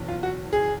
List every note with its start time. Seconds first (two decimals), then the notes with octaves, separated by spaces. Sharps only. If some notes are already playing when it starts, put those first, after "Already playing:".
Already playing: F#1 E2 B2
0.08 F4
0.23 F#4
0.53 G#4